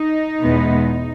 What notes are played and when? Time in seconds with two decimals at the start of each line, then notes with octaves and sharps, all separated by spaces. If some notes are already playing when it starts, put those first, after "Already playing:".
Already playing: D#4
0.41 E2 B2 G#3 B3